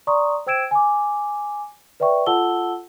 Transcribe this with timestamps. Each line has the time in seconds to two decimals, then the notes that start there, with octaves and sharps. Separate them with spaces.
0.07 D5 A#5 C6 C#6 D#6
0.47 C5 G5 E6 G#6 D7 E7
0.71 G#5 D6
2.00 B4 D5 E5 G5 C#6
2.26 F4 A4 F#5 A5 E6 G7